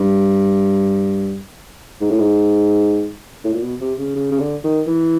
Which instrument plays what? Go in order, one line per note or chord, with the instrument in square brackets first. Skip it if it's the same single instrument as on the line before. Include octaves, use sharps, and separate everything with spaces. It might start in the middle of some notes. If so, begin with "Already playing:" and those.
Already playing: [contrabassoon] G2
G#2
A2
G#2
A2
A#2
B2
C3
C#3
C#3
C#3
D3
D#3
E3